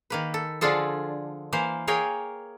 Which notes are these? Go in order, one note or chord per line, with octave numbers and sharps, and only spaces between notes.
D#3 A#3 B4
A4
D3 F3 D4 F4 G#4 A4
E3 A#3 C5 F5
A#3 G#4 A#4 C#5 G5 G#5